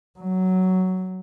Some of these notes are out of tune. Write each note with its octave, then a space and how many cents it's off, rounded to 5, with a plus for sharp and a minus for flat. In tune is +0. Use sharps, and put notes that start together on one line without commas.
F#3 +5